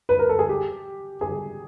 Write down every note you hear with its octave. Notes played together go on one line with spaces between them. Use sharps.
B4
A#4
A4
G#4
G4
G#4